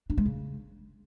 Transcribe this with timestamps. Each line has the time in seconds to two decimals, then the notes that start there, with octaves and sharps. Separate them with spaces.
0.10 D4
0.18 G#3
0.26 C#3